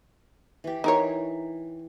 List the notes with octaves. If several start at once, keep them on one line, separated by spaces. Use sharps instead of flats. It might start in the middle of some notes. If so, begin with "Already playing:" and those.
E3 G4
E3 D#4 A#4 C#5